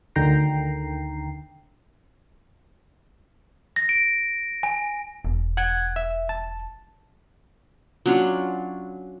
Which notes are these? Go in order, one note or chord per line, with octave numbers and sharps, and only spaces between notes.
D2 D3 D#3 G5 A#5 C7
A#6
D7
G#5
E1
F#5 F#6 G#6
E5
A5
F#3 C#4 D4 F4